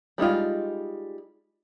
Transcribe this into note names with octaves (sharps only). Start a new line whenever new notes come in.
G3 G#3 D#4 F4